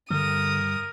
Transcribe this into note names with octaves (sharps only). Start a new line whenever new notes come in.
G2 D3 A#4 D#6